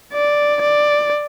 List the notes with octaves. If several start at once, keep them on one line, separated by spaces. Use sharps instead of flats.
D5
D5